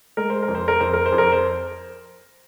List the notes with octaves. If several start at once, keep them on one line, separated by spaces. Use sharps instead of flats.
G#3 A#4
C5
A#4
F2
C5
A#4
F2 C5
A#4
C5
F2
A#4
C5